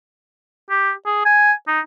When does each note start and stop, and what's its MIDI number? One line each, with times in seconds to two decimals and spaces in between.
0.70 0.92 67
1.06 1.25 68
1.25 1.52 80
1.68 1.80 63